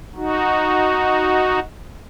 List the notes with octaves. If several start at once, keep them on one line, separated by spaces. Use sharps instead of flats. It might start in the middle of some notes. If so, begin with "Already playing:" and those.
D#4 F#4